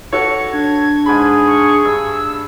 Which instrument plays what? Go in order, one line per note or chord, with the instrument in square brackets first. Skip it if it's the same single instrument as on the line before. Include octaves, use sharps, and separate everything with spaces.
[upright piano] F#4 A4 C#5 [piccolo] C#7
[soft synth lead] D4 [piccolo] G#6
[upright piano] G#2 B5 [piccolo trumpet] G#4
[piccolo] C#6
[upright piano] G2 [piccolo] E6